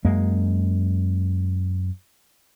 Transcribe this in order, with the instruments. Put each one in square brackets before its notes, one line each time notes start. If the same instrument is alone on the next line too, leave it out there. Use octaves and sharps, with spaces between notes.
[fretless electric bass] F#2 G#3 A#3